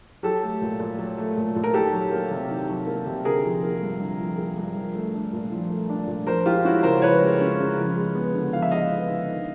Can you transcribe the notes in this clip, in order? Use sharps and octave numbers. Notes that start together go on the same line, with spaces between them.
F#3 G4 A4
A3
A#2
A#2
F#3
A3
A#2
A#2
A#4
D#3 G4 A4
F#3
A#3
C3
D#3
F#3
A#3
C3
D3 G#4 A#4
F3
A#3
G2
D3
F3
A#3
G2
F3
A3
D4
A#2
F3
A3
D4
A#2
F3 A#4 C5
G#3 F4 G4
C#4 E4 F#4
C#3 A#4 C5
F3 B4 C#5
G#3
C#4
C#3
F3
G#3
B3
D3
F3 F5
E5
G#3 D#5 F5
B3
D3
D#3